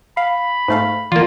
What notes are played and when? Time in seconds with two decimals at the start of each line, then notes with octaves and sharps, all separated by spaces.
0.17 F5 B5
0.68 G#2 A3 F5
1.12 E3 A#3 F4 D5